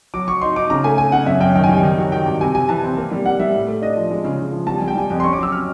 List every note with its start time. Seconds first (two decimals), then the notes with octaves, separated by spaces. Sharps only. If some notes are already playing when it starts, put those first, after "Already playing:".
0.14 F#3 D6
0.28 F#3 C#6
0.41 D#4 C6
0.56 D#4 D6
0.70 C#3 A#5
0.84 A3 G#5
0.98 A3 G#5
1.12 C#3 F#5
1.26 F#2 E5
1.40 F#2 G5
1.55 D#3 G5
1.64 G#5
1.69 G3 G5
1.83 D#3
1.98 F#3
2.12 D#3 G5
2.26 G2
2.41 C3 G#5
2.54 C3 G#5
2.69 E3 A5
2.83 C4
2.97 A#3
3.11 G3
3.25 G3 F#5
3.40 G3 E5
3.54 A2
3.67 A3
3.82 D4 D#5
3.97 F3
4.11 G#3
4.24 C#3
4.39 C#3
4.53 F3
4.67 G3 A5
4.78 G3 G#5
4.88 G5
4.95 G3 G#5
5.10 F2
5.20 C6
5.24 C#4 C#6
5.33 D6
5.38 F#3 E6
5.52 C#4 F6